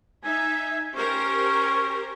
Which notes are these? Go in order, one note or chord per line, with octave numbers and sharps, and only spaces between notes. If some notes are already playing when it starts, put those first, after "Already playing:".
D#4 E5 G#5
C#4 G4 A#4 C5